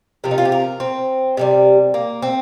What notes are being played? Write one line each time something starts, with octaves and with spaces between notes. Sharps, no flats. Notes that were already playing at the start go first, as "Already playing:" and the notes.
C3 F3 A#4
D#4
F4
G4
A#4
C4
C3 D#3 G3
A#3
C4